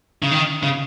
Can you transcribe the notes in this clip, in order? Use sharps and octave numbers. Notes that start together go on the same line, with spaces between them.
C#3
D#3
C#3